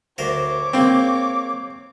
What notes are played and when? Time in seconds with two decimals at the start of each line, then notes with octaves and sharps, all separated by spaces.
0.18 D2 A#4 C5 C#5 D6
0.73 G#3 A#3 C4